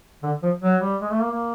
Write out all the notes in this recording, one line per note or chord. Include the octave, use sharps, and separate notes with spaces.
D3
F3
F#3
G3
G#3
A3
A#3
A#3